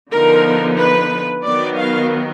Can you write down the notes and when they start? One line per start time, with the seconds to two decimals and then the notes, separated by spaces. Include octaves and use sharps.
0.12 D3 F3 B3 D#4 A#4
0.78 B4
1.44 D#3 F#3 B3 D5
1.77 F5